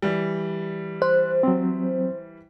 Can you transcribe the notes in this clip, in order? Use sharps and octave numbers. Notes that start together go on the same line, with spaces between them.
E3 G3
C5 F#6
F#3 C4